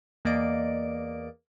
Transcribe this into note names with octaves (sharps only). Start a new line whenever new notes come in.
E2 A#3 D5 D#5 D7